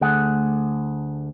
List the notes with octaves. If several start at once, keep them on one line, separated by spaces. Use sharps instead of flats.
D2 A3 G#4 F#5